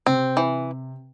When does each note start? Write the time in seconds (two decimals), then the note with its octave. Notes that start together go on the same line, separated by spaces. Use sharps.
0.06 C3 C4
0.37 E3